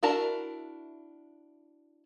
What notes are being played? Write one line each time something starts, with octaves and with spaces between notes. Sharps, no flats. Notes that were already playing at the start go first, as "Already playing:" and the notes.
D4 E4 F#4 A#4 A5